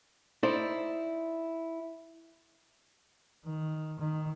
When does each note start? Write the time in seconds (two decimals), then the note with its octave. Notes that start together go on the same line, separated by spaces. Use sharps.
0.43 D#4 E4 A4 C5 D5
3.45 D#3
3.99 D#3